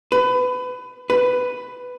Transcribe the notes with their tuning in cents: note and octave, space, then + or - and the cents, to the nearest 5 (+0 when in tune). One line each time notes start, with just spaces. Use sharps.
B4 +25
B4 +10